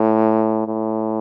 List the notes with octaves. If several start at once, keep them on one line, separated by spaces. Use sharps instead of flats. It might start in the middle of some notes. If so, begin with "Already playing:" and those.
Already playing: A2
A2